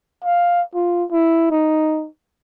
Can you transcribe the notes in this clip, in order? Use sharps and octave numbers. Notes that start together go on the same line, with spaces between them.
F5
F4
E4
D#4